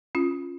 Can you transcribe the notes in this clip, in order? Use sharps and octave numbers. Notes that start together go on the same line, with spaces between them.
C#4 F4